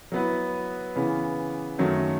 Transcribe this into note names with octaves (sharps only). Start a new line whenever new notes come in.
F#3 B3 E4 B4
C#3 E3 B3
F#2 D#3 F#3 A3